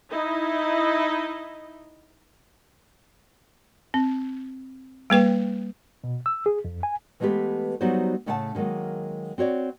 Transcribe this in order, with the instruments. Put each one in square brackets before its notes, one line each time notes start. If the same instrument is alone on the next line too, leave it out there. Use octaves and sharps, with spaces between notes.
[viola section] D#4 E4 D#5
[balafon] C4
G3 A#3 B4 G5
[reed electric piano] B2
E6
G#4
F2
G#5
[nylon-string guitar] E3 G#3 A3 B3 G4 B4
F#3 G3 B3 D#4 F#4 C5
A2 C#3 A3 F#5 G#5 A5
D3 D#3 F#3 G#3 A#3
C4 F#4 C#5 D5